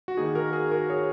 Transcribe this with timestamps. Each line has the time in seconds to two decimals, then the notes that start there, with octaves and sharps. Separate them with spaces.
0.08 F#4
0.17 D#3 A#3 D#4 G#4
0.35 F#4 A#4
0.53 G#4
0.71 F#4 A#4
0.90 G#4 C#5